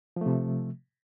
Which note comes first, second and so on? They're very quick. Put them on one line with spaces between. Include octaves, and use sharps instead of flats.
F3 A3 C3